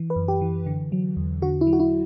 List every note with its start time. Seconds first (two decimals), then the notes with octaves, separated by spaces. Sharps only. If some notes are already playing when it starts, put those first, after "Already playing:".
Already playing: E3
0.10 B4
0.16 F#2
0.28 G4
0.41 E3
0.66 D3
0.92 F#3
1.17 E2
1.42 D3 F#4
1.61 E4
1.67 F#3
1.73 F#4
1.80 E4